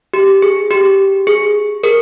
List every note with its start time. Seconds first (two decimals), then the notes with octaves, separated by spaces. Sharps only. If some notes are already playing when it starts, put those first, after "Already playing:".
0.14 G4
0.42 G#4
0.70 G4
1.27 G#4
1.83 G#4 A#4